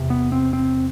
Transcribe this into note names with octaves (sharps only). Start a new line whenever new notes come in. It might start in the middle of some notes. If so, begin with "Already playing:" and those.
Already playing: E2 C3
B3
C4
C4